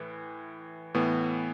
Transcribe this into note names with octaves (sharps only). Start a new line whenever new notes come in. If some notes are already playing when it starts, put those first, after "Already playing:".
Already playing: A2 E3
A2 E3 B3